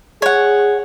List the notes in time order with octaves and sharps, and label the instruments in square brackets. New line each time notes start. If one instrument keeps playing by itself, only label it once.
[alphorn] G#4 [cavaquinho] C#5 F#5